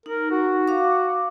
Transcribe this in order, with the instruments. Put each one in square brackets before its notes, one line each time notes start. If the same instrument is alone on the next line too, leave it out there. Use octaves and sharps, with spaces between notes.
[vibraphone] D#4 [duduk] A#4
[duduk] F#4
[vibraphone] F5 D6